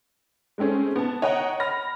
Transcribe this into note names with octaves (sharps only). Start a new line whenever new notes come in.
G#3 A3 C4 C#4 G#4
B3 A5
C#5 D#5 F#5 G5 A#5
B5 F6 A#6